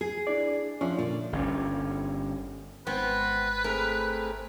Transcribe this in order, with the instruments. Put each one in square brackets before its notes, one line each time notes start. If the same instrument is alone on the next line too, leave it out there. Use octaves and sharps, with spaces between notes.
[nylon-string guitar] G#4
[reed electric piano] D4 E4 D5
[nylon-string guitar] F3 [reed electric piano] C#4 D4 E5
[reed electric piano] A#2 [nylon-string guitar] D3
[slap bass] G1 G2 C#4
[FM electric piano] G#1 G#2 [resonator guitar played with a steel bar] B3 C4 [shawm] B4
[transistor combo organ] A3 C4 G#4 [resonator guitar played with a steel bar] A#4